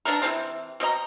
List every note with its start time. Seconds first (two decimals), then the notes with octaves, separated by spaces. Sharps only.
0.05 B3 D4 A4 A#4
0.22 C3 E3 G#3 C4
0.80 B2 C4 D#5 A#5